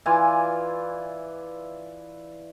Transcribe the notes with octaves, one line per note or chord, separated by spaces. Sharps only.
E3 F4 D5 G#5